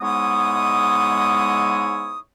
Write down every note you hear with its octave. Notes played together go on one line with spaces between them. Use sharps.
G#2 G#3 B3 E4 C#5 D#6